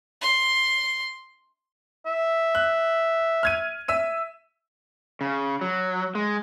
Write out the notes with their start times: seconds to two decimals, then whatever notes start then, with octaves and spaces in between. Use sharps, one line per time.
0.21 C6
2.06 E5
2.55 F#6
3.43 F6 G#6 D#7
3.88 E5 E6 D#7
5.21 C#3
5.61 F#3
6.15 G#3